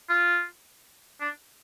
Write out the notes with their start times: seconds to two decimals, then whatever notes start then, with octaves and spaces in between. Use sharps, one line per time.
0.09 F4
1.20 D4